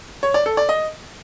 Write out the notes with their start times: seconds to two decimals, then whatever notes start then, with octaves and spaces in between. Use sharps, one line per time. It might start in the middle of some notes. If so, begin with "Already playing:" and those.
0.23 C#5
0.34 D5
0.46 A4
0.57 D5
0.69 D#5